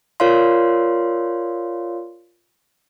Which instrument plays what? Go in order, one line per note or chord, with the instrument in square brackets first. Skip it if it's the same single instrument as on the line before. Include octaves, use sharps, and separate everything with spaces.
[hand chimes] F4 A#4 C#5 D5 F5 C6